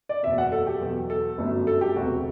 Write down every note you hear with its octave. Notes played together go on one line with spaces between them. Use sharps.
D5
F#1 E2 B2 E5
F#5
A4
G4
E2 B2 F#3
A4
G1 F#2 F#3 A3
A4
G4
E1 D2 C3 F#4